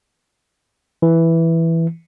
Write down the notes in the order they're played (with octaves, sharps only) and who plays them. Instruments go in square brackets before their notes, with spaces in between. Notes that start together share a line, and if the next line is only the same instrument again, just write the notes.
[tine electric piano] E3